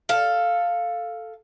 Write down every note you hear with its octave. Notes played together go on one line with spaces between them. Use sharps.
A4 F5